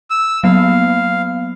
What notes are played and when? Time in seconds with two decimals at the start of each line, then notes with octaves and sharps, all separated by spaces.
0.10 E6
0.44 F#3 A#3 B3 F5